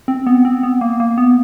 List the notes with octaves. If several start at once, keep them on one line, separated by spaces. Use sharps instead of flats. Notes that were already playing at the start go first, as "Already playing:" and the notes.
C4
B3
C4
B3
A#3
A#3
B3